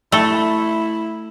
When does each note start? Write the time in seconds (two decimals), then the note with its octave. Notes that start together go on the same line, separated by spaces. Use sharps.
0.12 A3 E4 A4